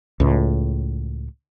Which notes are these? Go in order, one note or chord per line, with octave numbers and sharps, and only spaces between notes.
C#2 A2